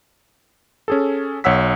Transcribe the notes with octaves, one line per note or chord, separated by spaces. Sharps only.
C#4 G#4 A4
B1 C#5 F#5 E6 B6